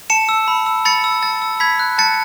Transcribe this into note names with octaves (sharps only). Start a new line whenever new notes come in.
A5 C#7 E7
E6
B5
E6
B5 A6 C#7
E6
A5 A6
E6
B5 G#6 B6
F#6
A5 A6 C#7